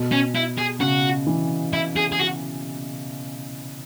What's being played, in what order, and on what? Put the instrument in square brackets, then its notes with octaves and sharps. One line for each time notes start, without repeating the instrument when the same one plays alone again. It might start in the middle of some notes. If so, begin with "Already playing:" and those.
Already playing: [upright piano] B2
[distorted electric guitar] C#4
E4
G#4
[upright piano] C#3 [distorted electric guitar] F#4
[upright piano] E3
[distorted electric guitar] E4
G#4
G#4
F#4